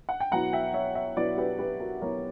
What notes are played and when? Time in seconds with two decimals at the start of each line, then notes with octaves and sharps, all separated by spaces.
0.09 F#5
0.20 G5
0.32 B2 F#3 B3 E4 F#5 A#5
0.53 E5 G5
0.74 C#5 E5
0.95 C#5 E5
1.16 B2 F#3 B3 E4 B4 D5
1.38 G4 B4
1.59 G4 B4
1.80 F#4 A#4
2.02 B2 F#3 B3 E4 A#4 C#5